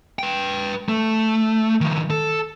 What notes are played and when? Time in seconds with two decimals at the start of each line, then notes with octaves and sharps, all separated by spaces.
0.19 B4 G5
0.89 A3
1.81 D#3 F3
2.10 A4